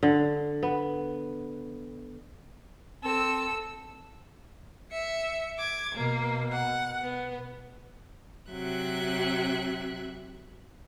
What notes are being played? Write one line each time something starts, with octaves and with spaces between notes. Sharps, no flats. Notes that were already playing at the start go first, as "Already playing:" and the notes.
D3
B3
C4 A4 E6
E5 C#7
D6 G#6
B2 A#3
F#5
B3
C3 F#3 E5 F#6